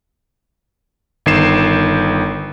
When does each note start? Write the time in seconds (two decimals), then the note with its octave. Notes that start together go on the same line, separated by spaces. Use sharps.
1.26 G1 D#3 C7 E7